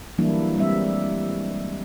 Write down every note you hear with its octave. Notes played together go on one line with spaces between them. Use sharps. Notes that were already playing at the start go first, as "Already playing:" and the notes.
E3 F#3 G3 A#3 D4 E4
G3 G#3 C4 E5